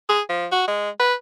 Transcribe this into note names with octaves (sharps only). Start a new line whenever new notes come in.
G#4
F3
F#4
G#3
B4